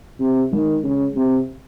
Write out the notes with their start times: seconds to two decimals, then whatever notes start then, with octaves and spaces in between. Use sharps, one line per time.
0.20 C3
0.52 D#3 G#3
0.83 C#3
1.16 C3